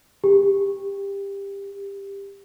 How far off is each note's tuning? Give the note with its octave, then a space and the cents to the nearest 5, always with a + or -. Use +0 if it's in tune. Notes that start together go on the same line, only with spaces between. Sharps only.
G4 +20